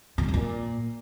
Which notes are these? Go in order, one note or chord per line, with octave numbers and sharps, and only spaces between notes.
B2
G#2
F2
A#2